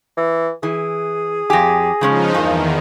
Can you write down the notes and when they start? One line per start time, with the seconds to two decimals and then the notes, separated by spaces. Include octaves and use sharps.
0.17 E3
0.63 E3 G#4
1.50 F2 G4 G#5 A#6
2.01 C#3 F3 G#3 C#4 D#4
2.35 E2 G2 D#3 A#3 G#5